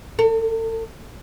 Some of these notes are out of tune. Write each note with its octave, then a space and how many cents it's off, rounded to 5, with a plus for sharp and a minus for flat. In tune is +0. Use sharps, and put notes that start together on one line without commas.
A4 +40